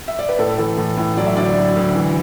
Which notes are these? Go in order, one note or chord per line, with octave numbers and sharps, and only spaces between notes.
E5
D5
B4
A2 A4
E3 A4
A2
A2
F#3 D5
E5
D2 D5
F#3
D2
E3